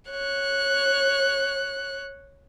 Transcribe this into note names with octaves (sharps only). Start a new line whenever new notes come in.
C#5 F#6